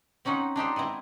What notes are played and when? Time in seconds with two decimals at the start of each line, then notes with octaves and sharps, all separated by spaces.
0.25 C4 C#4 D#4 F#5
0.56 D4 D#4 G4 C5
0.76 G#3 B3 C4 E4